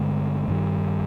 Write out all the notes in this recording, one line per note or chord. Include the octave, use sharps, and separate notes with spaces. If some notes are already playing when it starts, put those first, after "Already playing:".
Already playing: G2 D3 G#3
G2 D#3 G3